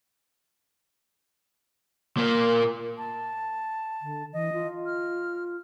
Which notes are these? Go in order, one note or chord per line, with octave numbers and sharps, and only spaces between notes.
A#2 A#3
A5
D3
E3 D#5
F4
F6